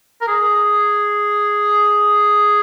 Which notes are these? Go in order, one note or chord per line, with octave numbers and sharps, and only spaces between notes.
A#4
G#4